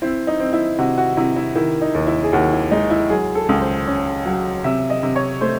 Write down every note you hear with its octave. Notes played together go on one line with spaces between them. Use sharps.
C4 E4
D#4
C4
E4
C3 F#4
F#4
C3 E4
E4
D#3 E4
D#4
D#2
E4
G#4
D#2 F#4
E4
G#3 D#4
E4
F#3 G#4
A4
C#2
C5
C#4
F#3
C3 E5
D#5
C3
C#5
A3 C5